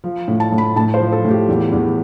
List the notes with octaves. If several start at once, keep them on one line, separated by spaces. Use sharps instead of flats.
F3
A2
A5
A2
B5
A2 A5
C5
F3
A4
A2
G4
E2
E2